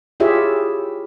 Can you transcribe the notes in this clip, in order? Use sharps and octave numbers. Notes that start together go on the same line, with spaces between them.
E4 F4 G4 G#4 C#5 E5